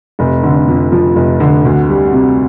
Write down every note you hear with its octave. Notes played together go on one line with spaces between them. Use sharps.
F1
D3
F2
F3
F1
D3
D2
G3
C3